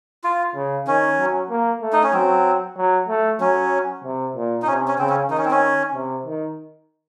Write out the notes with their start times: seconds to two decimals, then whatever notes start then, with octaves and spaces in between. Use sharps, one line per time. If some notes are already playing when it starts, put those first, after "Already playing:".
0.24 F4
0.55 C#3
0.87 D#3 C#4
1.19 F#3
1.50 A#3
1.82 A3
1.93 D#4
2.03 C#4
2.13 F#3 C4
2.77 F#3
3.09 A3
3.40 F#3 C#4
4.04 C3
4.36 A#2
4.62 D#4
4.67 C3 C#4
4.88 C#4
4.98 C#3 C4
5.09 C#4
5.30 D#3 D#4
5.38 C#4
5.45 C4
5.51 C#4
5.94 C3
6.26 D#3